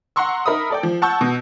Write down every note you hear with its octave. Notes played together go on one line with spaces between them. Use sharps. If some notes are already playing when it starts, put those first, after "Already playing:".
F#5 A#5 C6 C#6 E6
D#4 A#4 E5 B5 D#6
A4 D5 G5
F3
F#5 A5 C#6 E6 G6
B2